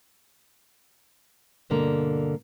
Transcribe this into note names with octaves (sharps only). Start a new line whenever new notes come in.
G2 B2 D3 A#3 A#5